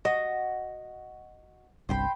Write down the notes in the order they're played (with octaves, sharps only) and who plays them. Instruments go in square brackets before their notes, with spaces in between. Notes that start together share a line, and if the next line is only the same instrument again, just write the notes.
[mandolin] F#4 [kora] D#5
[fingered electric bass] G1 C2 [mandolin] C5 G5 B5